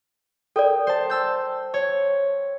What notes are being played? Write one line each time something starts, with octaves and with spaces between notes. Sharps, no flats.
A4 A#4 D5 G5
C5 A5
A5 E6 G6
C#5 C#6